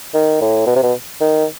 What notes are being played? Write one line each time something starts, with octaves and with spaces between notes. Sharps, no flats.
D#3
A2
B2
C3
B2
D#3